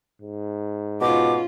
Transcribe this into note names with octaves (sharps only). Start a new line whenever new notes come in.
G#2
B2 C#4 F4 D6